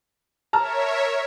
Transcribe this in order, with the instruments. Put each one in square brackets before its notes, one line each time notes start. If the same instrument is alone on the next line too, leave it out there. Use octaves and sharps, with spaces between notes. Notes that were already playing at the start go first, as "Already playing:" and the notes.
[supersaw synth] A#4 C#5 E5 [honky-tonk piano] A5 A#5 F6